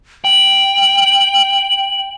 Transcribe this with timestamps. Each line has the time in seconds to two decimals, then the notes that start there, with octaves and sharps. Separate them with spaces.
0.24 G5 F#7